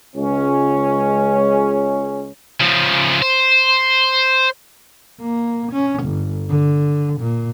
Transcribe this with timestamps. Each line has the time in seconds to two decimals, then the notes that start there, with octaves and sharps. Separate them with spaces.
0.16 C#2 G#3 C#4
2.61 C#3 F3
3.22 C5
5.21 A#3
5.72 C#4
6.05 G1
6.49 D3
7.20 A#2